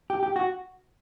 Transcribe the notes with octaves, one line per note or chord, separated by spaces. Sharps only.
G4
G4
F#4